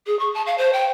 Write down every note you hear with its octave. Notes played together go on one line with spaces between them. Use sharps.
G#4
C#6
A5
F5
C5
G5